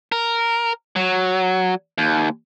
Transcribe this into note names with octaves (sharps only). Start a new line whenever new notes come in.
A#4
F#3
D#2